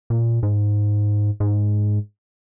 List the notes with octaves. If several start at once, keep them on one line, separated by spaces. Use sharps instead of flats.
A#2
G#2
G#2